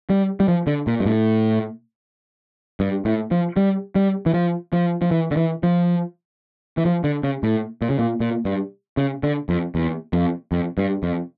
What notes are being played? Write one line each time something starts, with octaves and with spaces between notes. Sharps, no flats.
G3
G3
F3
D3
A#2
G2
A2
G2
A2
F3
G3
G3
E3
F3
F3
F3
E3
D3
E3
F3
E3
F3
D3
C#3
A2
A#2
C#3
A#2
A#2
G2
C#3
D3
F2
E2
F2
F2
G2
F2